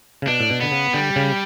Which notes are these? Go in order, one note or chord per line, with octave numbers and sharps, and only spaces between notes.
C#3
B2 D4
A2
B2
D3 B3
C#3
D3 G3
C#3